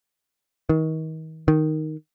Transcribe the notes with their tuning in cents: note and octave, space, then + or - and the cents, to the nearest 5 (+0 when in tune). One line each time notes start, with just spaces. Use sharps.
D#3 +35
D#3 +0